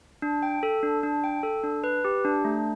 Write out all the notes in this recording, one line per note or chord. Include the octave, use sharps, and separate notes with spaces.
D4
G5
A4
D4
D4
G5
A4
D4
B4
G4
D4
A3